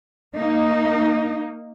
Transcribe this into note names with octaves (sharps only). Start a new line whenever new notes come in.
A#3 D#4